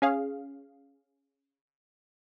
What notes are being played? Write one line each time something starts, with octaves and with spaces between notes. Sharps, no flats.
C#4 G#4 F5